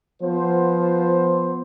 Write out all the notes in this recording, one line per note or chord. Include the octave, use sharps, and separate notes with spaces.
F3 B3 C5